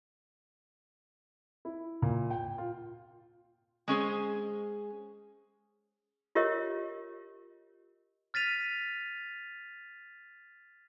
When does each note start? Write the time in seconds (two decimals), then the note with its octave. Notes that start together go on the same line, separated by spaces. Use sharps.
1.65 E4
2.02 A#2
2.30 G5
2.58 F4
3.88 G#3 C#4 G#4 C5
6.35 F4 G4 A#4 C#5 D#5
8.34 F6 A6 B6 D#7 F7